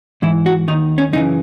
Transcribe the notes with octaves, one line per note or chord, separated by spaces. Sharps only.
G#2 E3 E4
F#4
D#2 D#3 D#4
C#4
F#2 C#3 E3 D#4